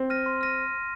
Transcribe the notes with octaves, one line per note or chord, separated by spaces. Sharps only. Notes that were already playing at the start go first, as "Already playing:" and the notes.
Already playing: C4
F6 A#6 D#7
C6
F6 A#6 D#7